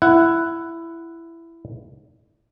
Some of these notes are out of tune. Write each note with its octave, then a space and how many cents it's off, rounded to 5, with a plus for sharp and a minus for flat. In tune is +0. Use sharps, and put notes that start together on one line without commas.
E4 +15 F#5 +0